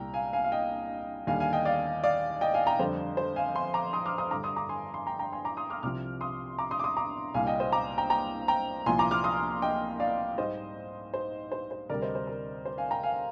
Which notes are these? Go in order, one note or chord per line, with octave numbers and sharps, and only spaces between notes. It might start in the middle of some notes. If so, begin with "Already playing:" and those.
Already playing: C2 A#2 G3 G5 A#5
F5 G#5
F5 G#5
F5
D#5 G5
D#2 D3 G3 F5 G#5
F5 G#5
D#5 G5
D5 F5
D5 F5
D#5 G5
F5 G#5
G5 A#5
F2 D3 G3 C5
C5
F5 G#5
G#5 C6
A#5 D6
C6 D#6
D6 F6
C6 D#6
G2 D3 G3 A#5 D6
C6 D#6
A#5 D6
G#5 C6
G#5 C6
G5 A#5
G5 A#5
G#5 C6
A#5 D6
C6 D#6
D6 F6
C2 C3 F3 D6 F6
C6 D#6
A#5 D6
C6 D#6
D6
C6 D#6
A#5 D6
C2 A#2 G3 F5 G#5
D#5 G5
C5 D#5
A#5 D6
G5 A#5
G5 A#5
G5 A#5
C2 A#2 F3 G#5 C6
A#5 D6
D6 F6
C6 D#6
D#5 G5
D5 F5
G#2 G3 C5 D#5
C5
C5
C5
D2 C3 G3 A#4 D5
C5 D#5
C5
A#4
C5
F5 G#5
G5 A#5
F5 G#5